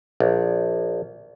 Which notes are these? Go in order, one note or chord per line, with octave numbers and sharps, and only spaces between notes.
A#1